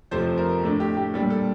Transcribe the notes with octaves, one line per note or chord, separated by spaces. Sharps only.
F2 C3 F3 A3 C5
A#4
A2 A3 D4
G4
G4
A#2 G3 D4 A4
A4